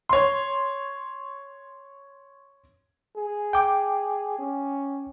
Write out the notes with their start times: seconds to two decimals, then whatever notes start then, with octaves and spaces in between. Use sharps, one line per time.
0.09 C#5 C6
3.16 G#4
3.53 G5 D6
4.39 C#4